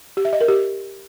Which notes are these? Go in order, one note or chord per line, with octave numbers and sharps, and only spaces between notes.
G4
E5
D#5
A#4
G4